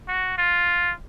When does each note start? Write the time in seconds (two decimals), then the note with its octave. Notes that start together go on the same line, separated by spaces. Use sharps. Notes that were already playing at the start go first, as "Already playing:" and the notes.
0.08 F#4
0.38 F4